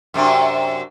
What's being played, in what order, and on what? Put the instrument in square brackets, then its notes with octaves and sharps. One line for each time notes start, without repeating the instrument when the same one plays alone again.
[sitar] F#2 C3 D4